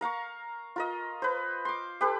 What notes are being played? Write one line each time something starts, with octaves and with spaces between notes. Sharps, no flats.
A#4 F5 A#5 C#6
F4 A#4 D#5
B4 C5
C6 D6
G4 A4 B4